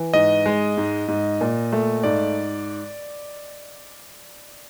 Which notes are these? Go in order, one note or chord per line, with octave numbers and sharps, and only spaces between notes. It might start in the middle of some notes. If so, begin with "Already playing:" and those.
Already playing: E3
G#2 D#5
G#3
G#2
G#2
A#2
A3
G#2 D5